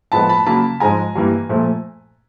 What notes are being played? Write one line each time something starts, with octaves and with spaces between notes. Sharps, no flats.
A2 F3 G#3 B3 A5 B5
A5 B5
C#3 F#3 A#3 A5 B5
G#2 F3 G#3 G#5 A#5
G2 E3 G3 A#3
A#2 F3 A3